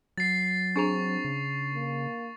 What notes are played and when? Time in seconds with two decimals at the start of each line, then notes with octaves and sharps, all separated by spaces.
0.18 F#3 A6 C7
0.76 C4 D4 G#4 A#5 C#6 F7
1.25 C#3
1.74 A#3